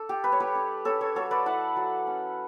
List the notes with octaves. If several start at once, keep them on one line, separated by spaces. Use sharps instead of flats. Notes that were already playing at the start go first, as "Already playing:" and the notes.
Already playing: D4 A4
G4
G3 B4
C#5
G4 B4
D4
C#4 A4 C#5
A4 C#5
F#3 A4 C#5
B4 D5
E4 F#5 A5
F#3
C#4